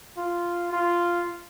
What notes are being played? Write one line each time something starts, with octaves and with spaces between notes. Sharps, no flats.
F4
F4